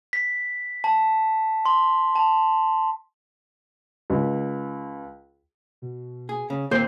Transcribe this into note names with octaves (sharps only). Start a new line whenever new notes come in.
B6
A5
C6
A5
C#2
B2
G#4
C#3
A#2 D#3 C4 C5